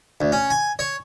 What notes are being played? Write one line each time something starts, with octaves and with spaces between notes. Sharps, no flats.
D2
C#4
G#5
C#5